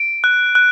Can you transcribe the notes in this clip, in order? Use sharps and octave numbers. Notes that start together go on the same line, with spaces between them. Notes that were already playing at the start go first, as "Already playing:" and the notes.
Already playing: D7
F#6
F#6